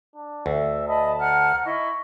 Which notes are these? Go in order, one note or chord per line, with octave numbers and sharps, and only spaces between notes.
D4
D2 E5
D#5 A5 B5
F#5 A#5 F6
E4 D#5 C#6